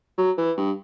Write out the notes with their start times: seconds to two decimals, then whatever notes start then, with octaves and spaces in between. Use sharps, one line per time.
0.17 F#3
0.38 E3
0.57 G2